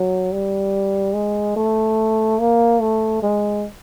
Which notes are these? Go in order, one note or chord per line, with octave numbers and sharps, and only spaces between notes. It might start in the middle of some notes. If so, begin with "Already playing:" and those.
Already playing: F#3
G3
G#3
A3
A#3
A3
G#3